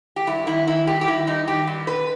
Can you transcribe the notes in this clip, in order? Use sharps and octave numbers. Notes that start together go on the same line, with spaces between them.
G4
G2 E4
D#3 E4
D#3 E4
G2 G4
G4
D#3 E4
G2 D#4
D#3 G4
G2
B2 B4